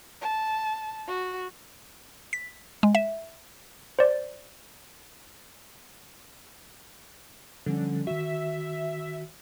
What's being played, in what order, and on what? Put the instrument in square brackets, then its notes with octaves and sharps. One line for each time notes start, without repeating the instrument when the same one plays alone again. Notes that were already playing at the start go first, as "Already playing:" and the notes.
[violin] A5
F#4
[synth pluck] B6
G#3
E5
[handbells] C5 D5
[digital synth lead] D3 [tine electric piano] F3 G3 C#4
[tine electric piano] D#3 F#4 [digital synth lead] E5